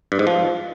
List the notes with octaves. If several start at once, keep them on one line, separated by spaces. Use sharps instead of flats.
G2
G#2
F3